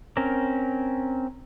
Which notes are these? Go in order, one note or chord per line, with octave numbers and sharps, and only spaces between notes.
C4 C#4 A#4